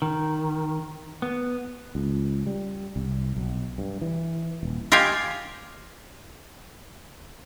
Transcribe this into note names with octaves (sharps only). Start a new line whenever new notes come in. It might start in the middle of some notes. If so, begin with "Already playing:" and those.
D#3
B3
C#2
G3
C2
B1
G2
E3
D#1
F4 G4 D#5 F5 G5 G#5